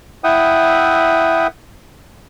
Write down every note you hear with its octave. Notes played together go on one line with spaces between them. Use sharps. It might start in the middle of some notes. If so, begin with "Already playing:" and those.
E4 E5 F#5 G5 D#6